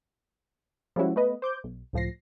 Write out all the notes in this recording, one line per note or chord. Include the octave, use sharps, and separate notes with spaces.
F3 G3 G#3 C#4 E4 F#4
A3 B3 B4 D#5
C5 D6 G6
B1
C#2 A2 F3 A#6 C7